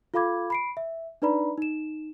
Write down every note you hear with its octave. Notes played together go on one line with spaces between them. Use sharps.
F4 A4 F5 B5 D6 G#6
B5 C7 D7
E5
D4 D#4 B4 D5 A#5 B5
D#4 E7